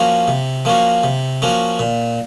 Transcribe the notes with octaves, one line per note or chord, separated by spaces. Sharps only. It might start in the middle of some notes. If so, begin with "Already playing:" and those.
Already playing: F3 A#3 C#4 F#4
C3
F3 A#3 C#4 F#4
C3
F3 A#3 C#4 F#4
A#2